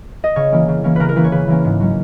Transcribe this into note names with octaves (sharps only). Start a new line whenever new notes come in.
D#5
C#3 C#5
E3 A#3 C#4
C#3
E3 A#3 C#4
C#3 A#4 B4
A#4
E3 A#3 C#4 B4
C#5
C#3 B4
E3 A#3 C#4
G#2
F#3 C#4